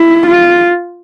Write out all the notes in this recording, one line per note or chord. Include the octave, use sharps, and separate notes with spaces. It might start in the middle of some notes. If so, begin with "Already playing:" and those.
Already playing: E4
F4